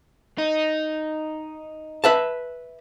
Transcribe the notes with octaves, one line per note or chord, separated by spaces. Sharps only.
D#4
B4 E5 A5